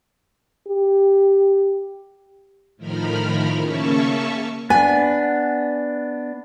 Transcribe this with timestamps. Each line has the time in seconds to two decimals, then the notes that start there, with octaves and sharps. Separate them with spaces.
0.67 G4
2.77 A2 D#3 F3 A#4 B5 F6
3.58 C#3 A#3 C#4 E5 A5 C#6
4.70 B3 D4 G#5